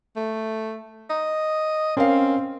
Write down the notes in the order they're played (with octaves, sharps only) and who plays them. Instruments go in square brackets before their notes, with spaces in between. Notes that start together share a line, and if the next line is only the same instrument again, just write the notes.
[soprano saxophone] A3
D#5
[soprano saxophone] C4 [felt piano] C#4 A#4 F5